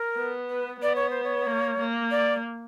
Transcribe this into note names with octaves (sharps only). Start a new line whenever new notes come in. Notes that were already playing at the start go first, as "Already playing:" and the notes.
Already playing: A#4
B3
B4
B3 D5
C#5
C5
C#5
A#3
A#3
D5